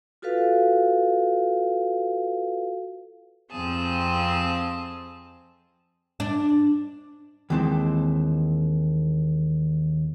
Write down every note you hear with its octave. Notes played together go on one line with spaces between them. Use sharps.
F4 F#4 A4 B4 F5
F2 C4 G#4 A5
D4
D#2 E3 G#3 C4 C5 A5